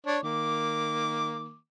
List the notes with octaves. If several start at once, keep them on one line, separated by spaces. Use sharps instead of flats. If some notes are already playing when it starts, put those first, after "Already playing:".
D4 C#5 D5
D#3 A#3 D6